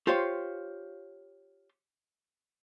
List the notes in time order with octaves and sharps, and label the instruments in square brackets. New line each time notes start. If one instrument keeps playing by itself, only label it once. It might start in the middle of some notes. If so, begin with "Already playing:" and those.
[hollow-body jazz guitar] F4 G4 C5 C#5 F5